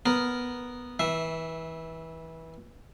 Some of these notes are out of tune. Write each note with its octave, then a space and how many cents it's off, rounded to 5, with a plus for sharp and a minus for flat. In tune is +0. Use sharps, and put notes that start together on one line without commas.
B3 +0 A#4 +0
E3 -25 E5 +0